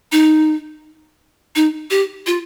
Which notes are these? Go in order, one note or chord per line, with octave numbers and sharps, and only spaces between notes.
D#4
D#4
G4
F4